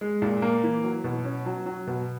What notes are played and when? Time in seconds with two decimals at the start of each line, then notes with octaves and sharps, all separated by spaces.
0.01 G#3
0.22 A#2
0.42 A#3
0.63 E3
0.84 F#3
1.04 B2
1.25 C#4
1.46 F#3
1.66 F#3
1.87 B2